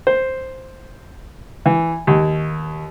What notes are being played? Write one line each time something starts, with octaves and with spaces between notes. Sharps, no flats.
C5
E3
D#2